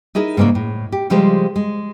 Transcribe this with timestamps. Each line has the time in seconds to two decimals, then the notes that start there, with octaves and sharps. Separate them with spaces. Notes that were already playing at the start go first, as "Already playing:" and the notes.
0.15 D#4 E4 G#4 A#4
0.37 G#2 C#3 A#3 C#4 D4
0.55 A2
0.92 G4
1.10 C#3 F3 G3 G#3 G4 C5
1.56 G#3